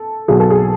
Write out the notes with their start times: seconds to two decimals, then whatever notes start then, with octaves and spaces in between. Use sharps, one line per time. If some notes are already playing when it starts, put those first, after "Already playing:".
Already playing: A4
0.28 B1 B2 F#3 G#4
0.40 A4
0.50 G#4